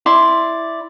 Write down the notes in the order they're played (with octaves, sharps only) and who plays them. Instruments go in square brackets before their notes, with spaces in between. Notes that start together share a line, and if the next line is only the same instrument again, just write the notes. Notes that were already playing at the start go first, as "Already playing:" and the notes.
[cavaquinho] E4 D5 C6